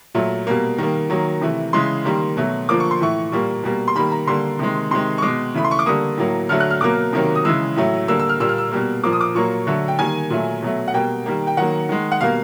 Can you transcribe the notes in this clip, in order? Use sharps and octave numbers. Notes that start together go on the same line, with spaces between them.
A#2 F#3 A3
B2 G3 A#3
D#3 G3 A#3
D#3 F#3 A#3
C3 E3 A3
C#3 E3 G#3 C6
D#3 G3 A#3
B2 F#3 A3
D3 F3 A#3 D6
C#6
C6
A2 E3 A3 C#6
A#2 G3 A#3
B2 G3 A#3
C6
D#3 G3 A#3 B5
A#5
D3 G3 A#3 C6
C3 D#3 G#3
C3 D#3 G#3 C6
C#6
B2 G#3 D6
C#3 E3 A3 B5
C6
C#6
D6
D3 G3 A#3 D#6
A2 F#3 A#3
D3 F#3 A3 F6
F#6
F6
B2 F#3 A#3 D6
C3 D#3 F#3 A#3
D#6
C#3 E3 G#3 E6
A2 F#3 A3
D3 G3 A#3 E6
E6
F6
A#2 G3 A#3 E6
F6
E6
B2 G3 A#3
A#2 F3 A#3 D6
D#6
D6
A#2 F#3 A#3 C#6
D3 F#3 A3
G5
D#3 G3 A#3 G#5
A#2 F#3 A3
B2 F#3 A3
F#5
B2 G3 A#3 G5
D#3 G3 A#3
G5
D#3 F#3 A#3 F#5
D#3 G#3
F#5
B2 G3 A#3 F5